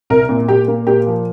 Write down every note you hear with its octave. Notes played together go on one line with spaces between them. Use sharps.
C2 A#4
A#2
A#2 G4
A#3
A#2 G4
F3